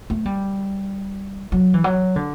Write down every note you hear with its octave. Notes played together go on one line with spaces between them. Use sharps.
A3
G3
F#3
E3
F#3
D3